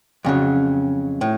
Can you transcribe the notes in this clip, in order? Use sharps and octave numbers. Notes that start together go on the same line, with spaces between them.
F2 C#3 F#3
A2